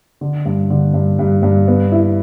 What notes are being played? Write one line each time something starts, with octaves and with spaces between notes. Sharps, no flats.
D3
G2
D3
G2
G2
G2
B3
E4